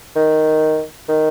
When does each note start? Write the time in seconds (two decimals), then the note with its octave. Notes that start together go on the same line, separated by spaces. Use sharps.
0.16 D#3
1.09 D#3